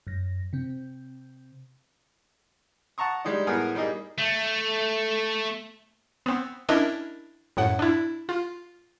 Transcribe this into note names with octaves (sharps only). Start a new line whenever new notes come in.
F#2 A#6
C3 C4
F#5 A5 A#5 C#6 D#6
G3 G#3 D4 D#4
A2 B3 G#4 A#4 G#5 F6
G3 A#3 D#4 G#4 D#5
A3
B3 C4
C#4 D4 E4 A#4 D#5 E5
F#2 A2 F#5
D4 E4
F4